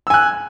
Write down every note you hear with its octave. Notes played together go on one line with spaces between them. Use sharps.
G#5 E6 F#6